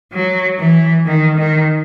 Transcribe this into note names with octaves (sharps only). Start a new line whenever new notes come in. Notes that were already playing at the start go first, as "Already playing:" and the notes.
F#3
E3
D#3
D#3